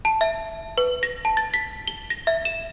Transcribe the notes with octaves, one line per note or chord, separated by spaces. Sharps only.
A5
E5
B4
A#6
A5
A6
B6
G7
A#6
E5
E7